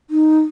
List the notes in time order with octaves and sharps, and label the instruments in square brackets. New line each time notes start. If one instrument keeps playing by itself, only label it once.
[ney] D#4